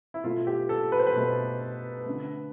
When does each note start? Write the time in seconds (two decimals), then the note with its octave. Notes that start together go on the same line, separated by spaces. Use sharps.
0.14 E4
0.24 B2 A3 F4
0.47 G4
0.69 A4
0.92 B4
0.99 C5
1.07 B4
1.16 B2 A3
2.06 D3 A3